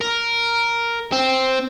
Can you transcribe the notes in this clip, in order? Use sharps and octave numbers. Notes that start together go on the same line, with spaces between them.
A#4
C4